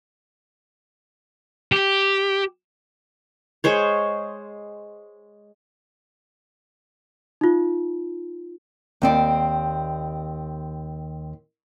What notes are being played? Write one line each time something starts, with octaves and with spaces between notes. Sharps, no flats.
G4
G#3 C5 C#5
D#4 F4
D#2 C4 D5